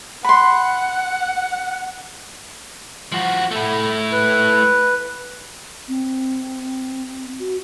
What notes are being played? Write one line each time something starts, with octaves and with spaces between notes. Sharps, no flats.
F#5 B5 C6
F3 F#4
A3 E4
B4
C4
F#4